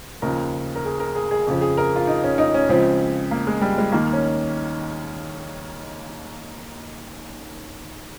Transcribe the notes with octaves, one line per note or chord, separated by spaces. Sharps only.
D#2 C#3 F3 A#4
A#4
G#4
A#4
G#4
G#4
F2 C#3 F3
G#4
A#4
F4
D#4
C#4
D#4
C#4
C#2 C#3 F3 C4
A#3
G#3
G3
G#3
D#2 D#3 A#3
C#4